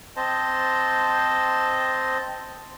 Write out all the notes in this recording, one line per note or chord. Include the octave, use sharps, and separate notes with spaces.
C4 C5 D#5 A5